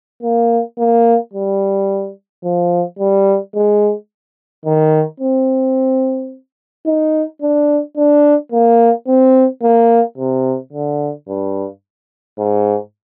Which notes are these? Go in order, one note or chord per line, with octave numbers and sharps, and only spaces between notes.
A#3
A#3
G3
F3
G3
G#3
D#3
C4
D#4
D4
D4
A#3
C4
A#3
C3
D3
G2
G#2